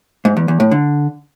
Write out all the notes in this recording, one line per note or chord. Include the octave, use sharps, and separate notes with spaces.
G#2
E2
E2
A2
D3